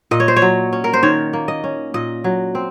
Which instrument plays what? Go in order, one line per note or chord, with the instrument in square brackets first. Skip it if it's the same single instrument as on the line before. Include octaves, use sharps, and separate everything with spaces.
[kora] A#2 D#5
C#5
C5
C#5
F#3
C#4
A#4
C5
D#3 C#5
A#3
D#5
C#4
A#2 D#5
F#3
C4